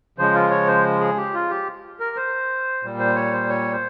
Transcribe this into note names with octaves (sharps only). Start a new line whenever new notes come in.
C#3 F3 G#3 C5
F4
C#5
C5
G#4
G4
F4
G4
A#4
C5
A#2 G3
C5
C#5
C5
C#5
C5